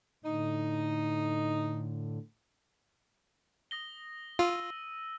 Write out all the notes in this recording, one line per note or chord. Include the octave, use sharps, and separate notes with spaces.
A2 D3 D#4
D#6 A#6 G7
F4 E6 D#7